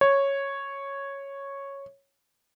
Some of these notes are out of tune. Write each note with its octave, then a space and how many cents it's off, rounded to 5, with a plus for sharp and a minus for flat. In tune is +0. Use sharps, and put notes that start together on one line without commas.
C#5 -5